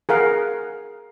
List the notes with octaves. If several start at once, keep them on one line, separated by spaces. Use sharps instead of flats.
G#4 A#4 F5 F#5